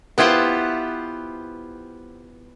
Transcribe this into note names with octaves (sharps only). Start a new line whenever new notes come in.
B3 E4 F4 G4 C5 F#5